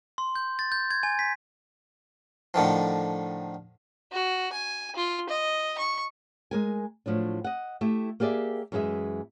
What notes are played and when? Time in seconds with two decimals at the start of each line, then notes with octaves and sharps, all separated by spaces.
0.18 C6
0.35 G6
0.59 A6
0.72 G6
0.91 G#6
1.03 G#5
1.19 B6
2.54 A2 D3 D#3 F3
4.12 F#4
4.52 G#5
4.95 F4
5.29 D#5
5.78 C#6
6.51 G#3 A#4 G#5
7.06 A2 F3 F#3 D4
7.44 D#5 F#5
7.81 A3 E4 G4
8.20 A#3 G4 G#4 D5 E5
8.72 F#2 E3 G#3 G#4 E5